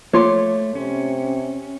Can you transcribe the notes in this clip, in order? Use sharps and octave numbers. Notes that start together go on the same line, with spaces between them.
F3 A3 A#3 F4 C#5 C6 D6
C3 C#4